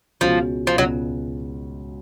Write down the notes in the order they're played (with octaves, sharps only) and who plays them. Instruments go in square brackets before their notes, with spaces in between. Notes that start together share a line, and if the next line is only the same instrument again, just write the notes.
[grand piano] C#2 B2 G#3 C#4 F#4 [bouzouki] F3
[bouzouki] F3
[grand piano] C#2 B2 G#3 C#4 F#4 [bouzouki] F#3